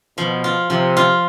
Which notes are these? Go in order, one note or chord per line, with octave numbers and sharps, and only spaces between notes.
B2 F3
F4
C3 F3
F4